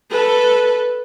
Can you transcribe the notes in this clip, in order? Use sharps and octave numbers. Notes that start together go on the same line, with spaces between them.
A4 B4